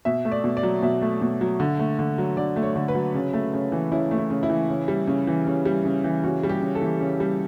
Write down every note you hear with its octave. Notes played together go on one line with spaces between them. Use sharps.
B2 E5
A3
D5
B2
D5
F#3
B2 E5
A3
B2
F#3
D3
A3
D3
F#3
D3 D5
A3
C#5
D3
B4
F#3
C#3
A3
C#3
E3
C#3 E4
A3
E4
C#3
E4
E3
C#3
G3
C#3
E3
C#3
G3
C#3
E3
C#3 F#4
G3
G4
C#3
A4
E3
C#3
G3